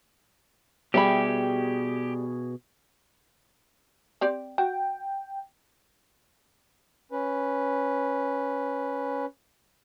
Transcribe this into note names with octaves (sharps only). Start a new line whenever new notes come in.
B2 G3 G4 G#4 E5 B5
C4 G4 D5
F#4 G5
C#4 B4